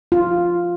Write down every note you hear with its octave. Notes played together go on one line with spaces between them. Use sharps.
F4